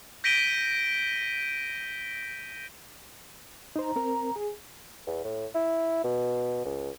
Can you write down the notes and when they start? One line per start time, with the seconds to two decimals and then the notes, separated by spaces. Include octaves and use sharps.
0.24 G6 A#6 B6 D7 D#7 G7
3.76 D#4 C5 A#5
3.96 C4 A#4
4.36 G#4
5.07 E2
5.24 A2
5.54 E4
6.04 B2
6.65 C#2